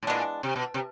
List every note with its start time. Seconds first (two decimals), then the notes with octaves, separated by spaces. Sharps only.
0.03 A2
0.07 A#2 E3 G#3 B3 D4
0.43 C3
0.56 B2
0.74 C3